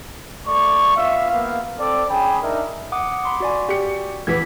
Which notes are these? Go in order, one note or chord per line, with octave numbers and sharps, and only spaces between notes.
A3 D5 C#6
B3 F4 E5 F5
A#3 B3 F5
C4 A4 D5
C#4 G#4 G5 B5
D4 D#4 A#4 D5 E5
F#5 D6 D#6
B5 C6 D6
F#4 D5 G#5
G4 C#7
E2 E3 B3 G#6 B6